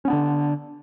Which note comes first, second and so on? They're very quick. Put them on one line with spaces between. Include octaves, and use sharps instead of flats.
C#4 B3 D4 D3